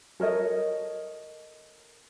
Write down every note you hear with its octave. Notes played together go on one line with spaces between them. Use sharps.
A4 A#4 C#5 D#5